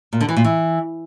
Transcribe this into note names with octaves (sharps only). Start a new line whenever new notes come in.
A#2
D3
E3
A#2
E3